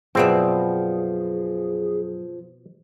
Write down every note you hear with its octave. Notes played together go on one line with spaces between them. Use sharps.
F#2 B2 F3 C4 G#4 D5 E5